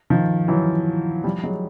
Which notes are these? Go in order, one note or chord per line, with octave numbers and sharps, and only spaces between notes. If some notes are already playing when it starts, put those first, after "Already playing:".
D#3 F3
E3 F#3
F3 G3
F#3 G#3